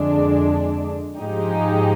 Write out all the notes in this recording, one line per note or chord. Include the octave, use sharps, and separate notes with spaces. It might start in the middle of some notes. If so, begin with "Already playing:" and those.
Already playing: F2 D3 G#3 D4
G#2 F3 G#3 D#4 G4